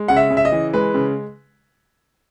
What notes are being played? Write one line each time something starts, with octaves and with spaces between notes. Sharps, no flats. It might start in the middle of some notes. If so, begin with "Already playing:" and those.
Already playing: G#3
C#3 F#5
E5
C#3
E5
D#5
E3
G#3 B4
C#3